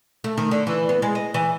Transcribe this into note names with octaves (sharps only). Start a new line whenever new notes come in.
A3
D#3
D3
E3
B3
G#3
D#5
E3